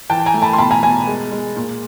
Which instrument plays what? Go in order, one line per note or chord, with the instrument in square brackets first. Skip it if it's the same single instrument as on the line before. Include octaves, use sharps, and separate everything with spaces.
[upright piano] E3 G5 A5
G#5 A#5
A3
A5 B5
C6
B2 A5 B5
G#5 A#5
B2 G#5 A#5
G#3
G#3
A#2